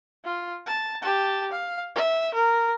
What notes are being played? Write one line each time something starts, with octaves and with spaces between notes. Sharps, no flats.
F4
A5
G4 A5
F5
E5
A#4